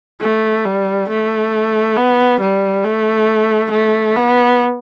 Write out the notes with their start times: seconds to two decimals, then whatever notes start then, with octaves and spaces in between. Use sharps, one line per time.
0.21 A3
0.65 G3
1.09 A3
1.97 B3
2.41 G3
2.84 A3
3.72 A3
4.16 B3